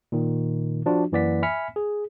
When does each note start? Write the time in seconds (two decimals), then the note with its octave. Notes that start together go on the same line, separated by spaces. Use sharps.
0.12 A#2 D#3
0.86 F3 D4 F4 F#4
1.12 F#2 E3 A#3 D5 F#5 B6
1.43 E5 G#5 B5 F6 B6 C#7
1.76 G#4